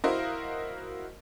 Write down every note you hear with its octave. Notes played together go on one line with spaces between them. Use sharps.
E4 F#4 A#4 C5 D#5 F5